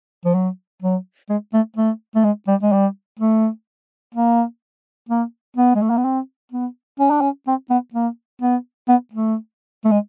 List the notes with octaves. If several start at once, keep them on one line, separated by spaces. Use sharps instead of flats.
F3
F#3
F#3
G#3
A3
A3
A3
G#3
G3
G#3
G3
A3
A#3
A#3
B3
G#3
A3
A#3
B3
C4
B3
C#4
D4
C#4
C4
B3
A#3
B3
B3
A3
A3
G#3